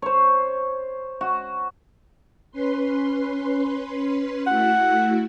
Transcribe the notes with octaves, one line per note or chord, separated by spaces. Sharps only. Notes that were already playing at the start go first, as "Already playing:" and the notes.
C5 C#5
F#4
C#4 B4 C6
A3 E4 F#4 F#5